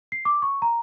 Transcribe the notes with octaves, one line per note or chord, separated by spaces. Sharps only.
C7
D6
C#6
A#5